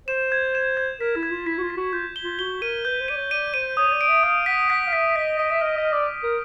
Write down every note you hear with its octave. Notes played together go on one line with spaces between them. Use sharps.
C5 E7
G#6
E7
G#6
A#4 B6
E4
G#6
F4
E4 B6
F#4
F4
B6
F#4
F4 G6
G7
F4
F#4 G7
A#4 D#7
B4 G6
C5
D5 D#7
C#5
D5 D#7
C5 D#7
C#5 D#6
C#5
D5
D7
E5
F5 D#6
F#5 B6
F#5 B6
F5
E5 B6
D#5 B6
D#5 D7
E5
D#5 F6
D#5
F6
D5
F6
A#4